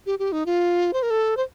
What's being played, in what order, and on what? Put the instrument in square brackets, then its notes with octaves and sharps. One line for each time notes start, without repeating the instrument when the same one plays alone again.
[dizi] G4
G4
D#4
F4
C5
A#4
A4
C5